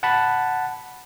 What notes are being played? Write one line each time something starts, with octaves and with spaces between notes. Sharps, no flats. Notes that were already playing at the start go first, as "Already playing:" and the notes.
F#5 A5 B5